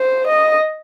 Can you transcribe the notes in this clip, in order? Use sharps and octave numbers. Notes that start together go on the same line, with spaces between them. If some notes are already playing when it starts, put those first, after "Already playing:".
Already playing: C5
D#5